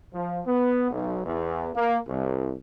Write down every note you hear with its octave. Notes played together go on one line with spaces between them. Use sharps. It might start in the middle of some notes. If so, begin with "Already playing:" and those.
F3
B3
B1
E2
A#3
C2